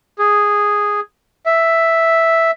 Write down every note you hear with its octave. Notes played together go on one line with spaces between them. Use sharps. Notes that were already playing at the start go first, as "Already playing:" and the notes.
G#4
E5